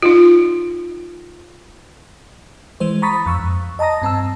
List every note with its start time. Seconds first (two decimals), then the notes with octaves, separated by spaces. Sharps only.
0.03 D#4 F4
2.80 E3 G#3 C5
3.02 A#5 B5 C#6 D#6 A6 B6
3.26 F2 C#6 E6
3.39 F2
3.79 D#5 A5 A#5 D#6 A#6
4.02 G2 C4 A5 E6